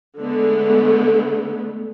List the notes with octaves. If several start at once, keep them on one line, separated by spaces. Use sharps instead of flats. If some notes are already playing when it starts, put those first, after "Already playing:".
D3 G#3 A3 B3